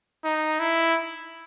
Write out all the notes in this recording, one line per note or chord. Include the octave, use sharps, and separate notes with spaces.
D#4
E4